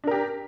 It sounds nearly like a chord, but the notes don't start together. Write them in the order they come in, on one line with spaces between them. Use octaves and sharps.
D4 A#4 G4